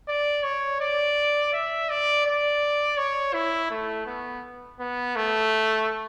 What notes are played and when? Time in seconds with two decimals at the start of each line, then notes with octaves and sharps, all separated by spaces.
0.08 D5
0.43 C#5
0.81 D5
1.53 E5
1.89 D5
2.26 D5
2.97 C#5
3.34 E4
3.70 A3
4.06 B3
4.80 B3
5.16 A3